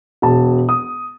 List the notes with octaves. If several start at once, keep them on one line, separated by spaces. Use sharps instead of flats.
E1 A5
D#6